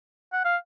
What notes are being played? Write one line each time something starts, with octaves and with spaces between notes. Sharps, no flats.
F#5
F5